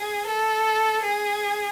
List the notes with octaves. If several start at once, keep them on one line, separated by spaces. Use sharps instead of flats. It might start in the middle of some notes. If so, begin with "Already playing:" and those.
Already playing: G#4
A4
G#4